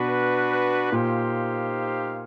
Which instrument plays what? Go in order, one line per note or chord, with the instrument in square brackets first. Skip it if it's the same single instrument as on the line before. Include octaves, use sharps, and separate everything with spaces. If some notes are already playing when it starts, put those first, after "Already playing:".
Already playing: [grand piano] B2 [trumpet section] D4 F#4 B4
[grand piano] A#2 [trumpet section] D#4 G4 C5 F5